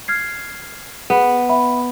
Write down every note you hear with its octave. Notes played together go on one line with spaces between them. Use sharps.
F6 G#6 C7
B3 G#4
E5 B5